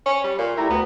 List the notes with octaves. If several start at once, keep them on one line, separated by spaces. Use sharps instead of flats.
C#4
G3
A#2
A3 E4 G4 A#5
D2 B3